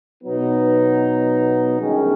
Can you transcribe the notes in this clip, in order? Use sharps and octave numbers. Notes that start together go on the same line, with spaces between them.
B2 F#3 B3 D#4
G1 F#2 D#3 G#3 C#4